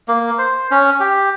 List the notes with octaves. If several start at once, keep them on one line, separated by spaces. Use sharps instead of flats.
A#3
C5
C#4
G4